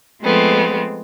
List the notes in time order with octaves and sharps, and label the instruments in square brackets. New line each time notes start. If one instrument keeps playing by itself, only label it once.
[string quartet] F3 G#3 A3 B3 C4